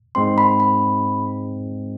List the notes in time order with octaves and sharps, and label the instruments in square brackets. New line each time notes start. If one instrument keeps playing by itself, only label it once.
[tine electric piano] G#2 G#3 C4 [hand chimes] C6
[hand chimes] B5
B5